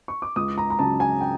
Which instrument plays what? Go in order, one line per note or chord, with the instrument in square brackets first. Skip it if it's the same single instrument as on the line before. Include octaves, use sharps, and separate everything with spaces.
[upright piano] C#6
D6
C#2 D#6
A#5
A#5
C#3 F#3 A5
G#5
G5